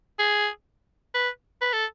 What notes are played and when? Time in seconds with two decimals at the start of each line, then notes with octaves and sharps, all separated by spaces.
0.19 G#4
1.14 B4
1.61 B4
1.73 A4